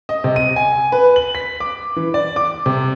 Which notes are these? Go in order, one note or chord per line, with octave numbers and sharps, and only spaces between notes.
D#5
C3
D#7
G#5
B4
F#7
B6
D6
E3
D5
D6
C3